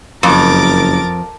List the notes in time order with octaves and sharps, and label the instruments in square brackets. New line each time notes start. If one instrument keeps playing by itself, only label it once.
[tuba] F#1 [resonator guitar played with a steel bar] F2 [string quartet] A#4 D6 A6